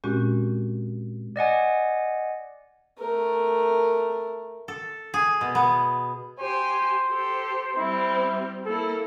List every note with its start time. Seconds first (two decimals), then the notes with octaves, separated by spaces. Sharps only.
0.04 A#2 G#3 C4 C#4 F#4 G4
1.36 D5 D#5 F#5 G#5
2.98 A3 A#4
4.68 A4
5.14 G#4
5.41 B2
5.55 B3
6.39 G4 C5 G#5
7.09 G4 A4
7.76 G3 C4 E4
8.66 A#3 E4 A4